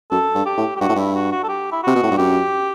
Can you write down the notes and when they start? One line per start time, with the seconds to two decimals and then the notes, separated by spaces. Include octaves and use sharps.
0.11 F#2 A4
0.35 G2
0.46 G4
0.57 A2
0.76 G4
0.80 G2 F#4
0.89 A2
0.95 G2 E4
1.15 F#4
1.32 F#4
1.44 A4
1.49 G4
1.72 E4
1.83 C3 F#4
1.95 B2
2.03 A2
2.11 G2
2.17 F#2 G4